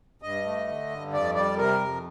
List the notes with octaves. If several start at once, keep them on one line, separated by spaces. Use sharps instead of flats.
G2 D#5
A3
D3
G2
F2 D5
G3 D5
C3 A#4
F2